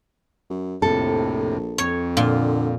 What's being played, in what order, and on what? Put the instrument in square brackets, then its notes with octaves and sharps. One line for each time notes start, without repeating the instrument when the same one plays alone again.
[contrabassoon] F#2
[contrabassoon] A#1 [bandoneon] F2 A2 C3 [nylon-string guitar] A4
[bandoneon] F2 [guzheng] C#5
[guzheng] A#2 [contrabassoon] D3